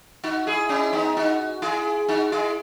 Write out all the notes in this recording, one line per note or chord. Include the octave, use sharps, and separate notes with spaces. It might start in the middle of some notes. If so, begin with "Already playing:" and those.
D#4 F#4
E4 G#4
C#4 E4
B3 D#4
D#4 F#4
E4 G#4
D#4 F#4
E4 G#4